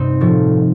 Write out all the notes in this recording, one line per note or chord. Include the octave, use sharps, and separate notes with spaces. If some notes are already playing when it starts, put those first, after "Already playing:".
Already playing: G2 C3 C4 D#4
A2 F3 A3